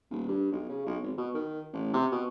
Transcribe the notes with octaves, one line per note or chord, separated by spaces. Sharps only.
D#1
G2
B1
C#3
B1
G#1
B2
D#3
A1
C3
B2